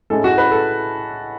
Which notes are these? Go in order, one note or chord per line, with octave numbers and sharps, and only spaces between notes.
A2 G#3 C#4 E4 A4
F#4
B4
A4